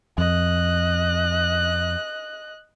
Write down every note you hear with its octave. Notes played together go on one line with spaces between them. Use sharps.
F2 D#5 F#6